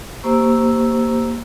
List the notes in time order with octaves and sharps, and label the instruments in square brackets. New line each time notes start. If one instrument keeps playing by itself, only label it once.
[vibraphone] A#3 G4 C5 A#5 C#6 E6